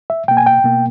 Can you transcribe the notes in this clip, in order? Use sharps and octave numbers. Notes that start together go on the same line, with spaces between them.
E5
B2 A#3 G5
G#5
G5
B2 A#3